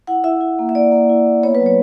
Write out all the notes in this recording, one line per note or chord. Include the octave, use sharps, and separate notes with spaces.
E4 F#5
E4 E5
E4
A#3
E5
A#3 D5
A#3
E4
A#3
B3 C#5
B4
F#3
C#5